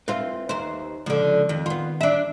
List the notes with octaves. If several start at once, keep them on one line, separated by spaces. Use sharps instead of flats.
C4 F4 B4 D#5 E5
D#2 C5
C#2 D3 F3
F2 D#3
B3 F4
D4 E5